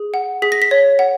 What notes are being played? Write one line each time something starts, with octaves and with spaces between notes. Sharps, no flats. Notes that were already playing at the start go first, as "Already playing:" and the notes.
Already playing: G#4
F#5
G#4 B6
A#6
B6
C#5
F#5